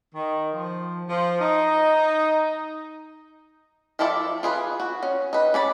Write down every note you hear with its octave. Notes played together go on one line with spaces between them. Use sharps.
D#3
F3
F3
D#4
F3 E4 A4 D5 E5
F4 G#4 B4
F#4
C#4
D#4 B4
C#4 D5 B5